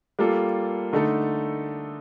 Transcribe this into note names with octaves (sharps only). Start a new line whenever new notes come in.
G3 A#3 F4 A4
D3 A3 D#4 A4